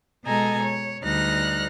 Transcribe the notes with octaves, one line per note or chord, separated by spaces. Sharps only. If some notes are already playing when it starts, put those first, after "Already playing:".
B2 G#3 A4 D#5 G#5 A#5
C#5
D2 G3 D#4 F6 F#6 A#6